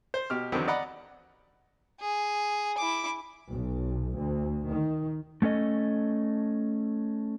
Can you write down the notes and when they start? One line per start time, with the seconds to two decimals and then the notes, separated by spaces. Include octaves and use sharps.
0.14 C5
0.30 B2 G4 F6
0.52 E2 D3 D#3 F#3 B3 C4
0.68 D5 D#5 F#5 A#5 B5
2.00 G#4
2.78 E4 D6
3.49 B1
4.17 D2
4.69 D#3
5.42 A3 C#4 A4 D#5